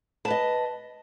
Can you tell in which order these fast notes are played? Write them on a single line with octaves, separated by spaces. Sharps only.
A5 B4 D#5